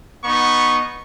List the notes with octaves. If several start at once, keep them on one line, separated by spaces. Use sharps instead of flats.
B3 D#4 C#6